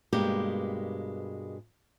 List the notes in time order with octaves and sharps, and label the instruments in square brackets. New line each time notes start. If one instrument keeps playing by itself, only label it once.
[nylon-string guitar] G2 B2 G#3 A#3 G4